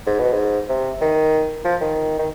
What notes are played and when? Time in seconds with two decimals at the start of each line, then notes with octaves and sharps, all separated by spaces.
0.07 G#2
0.20 B2
0.33 G#2
0.69 C3
1.01 D#3
1.65 F3
1.81 D#3
2.19 D#3